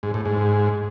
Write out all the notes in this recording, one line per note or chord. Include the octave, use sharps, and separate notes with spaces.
G#2
A2
G#2